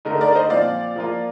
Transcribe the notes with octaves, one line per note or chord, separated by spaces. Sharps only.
D3 A3 D#4 A#4
A#4 D5
C5 D#5
A#2 F3 C4 D5 F5
F3 A#3 F4